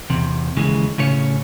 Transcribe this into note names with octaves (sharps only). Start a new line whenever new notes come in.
E2 C3
D#2 C#3 E3 G#3
A2 C#3 C#4 C#5